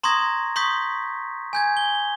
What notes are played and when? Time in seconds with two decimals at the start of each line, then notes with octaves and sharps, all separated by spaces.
0.03 A#5 C6 C#6 D#6 G#6 A#6
0.56 C6 C#6 D#6 G6 B6
1.53 G#5 G6 G#6
1.77 G7